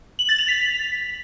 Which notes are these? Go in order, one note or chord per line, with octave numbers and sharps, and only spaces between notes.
F#7
A6
F7
B6